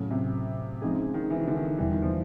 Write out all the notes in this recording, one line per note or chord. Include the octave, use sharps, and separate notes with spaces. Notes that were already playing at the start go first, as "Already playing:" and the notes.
Already playing: A2 C#3 F#3 A3
C3
C#3 F3 G#3 C4 D#4 G#4
D#3
E3
D#3
D3
D#3
E2 B2 E3 G3
D#3
F3